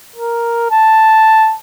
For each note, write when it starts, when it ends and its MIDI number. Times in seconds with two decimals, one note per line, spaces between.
0.16 0.71 70
0.71 1.55 81